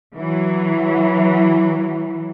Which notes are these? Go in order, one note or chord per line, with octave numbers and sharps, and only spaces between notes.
E3 F#3